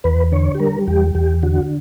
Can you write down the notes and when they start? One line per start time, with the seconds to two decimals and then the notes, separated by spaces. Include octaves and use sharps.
0.04 E2 B4
0.32 D3 C#5
0.55 G4
0.60 G3 A#4
0.87 E2 G4
1.15 E2 G4
1.43 D3 F#4